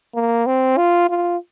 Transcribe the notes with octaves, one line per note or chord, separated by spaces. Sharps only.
A#3
C4
F4
F4